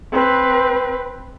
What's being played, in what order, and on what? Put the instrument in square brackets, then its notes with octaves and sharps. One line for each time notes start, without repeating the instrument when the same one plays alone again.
[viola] C4 B4